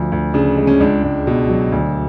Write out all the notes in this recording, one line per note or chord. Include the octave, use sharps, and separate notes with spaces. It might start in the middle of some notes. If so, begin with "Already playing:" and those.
Already playing: D2 F3
D2
C#3 D4
G#3
C#4
C#2 D4
C#2
B2
F#3
D2